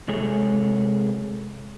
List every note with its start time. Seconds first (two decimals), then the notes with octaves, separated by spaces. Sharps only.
0.08 C3 G#3 G#4 A4 C#5